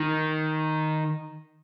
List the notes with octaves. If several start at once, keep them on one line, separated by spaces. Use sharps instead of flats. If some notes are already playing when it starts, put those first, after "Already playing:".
Already playing: D#3